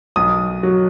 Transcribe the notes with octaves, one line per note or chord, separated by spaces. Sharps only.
B1 D#6
F#3